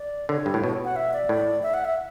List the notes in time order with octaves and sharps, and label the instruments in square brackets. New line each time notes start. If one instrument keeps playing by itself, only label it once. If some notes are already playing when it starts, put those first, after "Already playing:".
Already playing: [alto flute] D5
[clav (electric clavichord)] D3 [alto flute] C#5
[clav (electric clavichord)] G2
A2
[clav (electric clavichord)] B2 [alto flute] C#5
[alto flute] F#5
E5
D5
[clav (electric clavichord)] A2
[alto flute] E5
F#5
E5